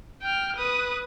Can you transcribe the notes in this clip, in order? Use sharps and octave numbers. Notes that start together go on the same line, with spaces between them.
G5 F6
B4 D#6